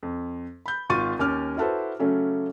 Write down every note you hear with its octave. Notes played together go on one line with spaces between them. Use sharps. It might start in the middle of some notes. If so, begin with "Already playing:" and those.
F2
B5 G6
G#1 F4 C#6 A6 D#7
D#2 C#4 D6 F6
E4 F#4 A4 B4 C5
C#3 F#3 A3 C#4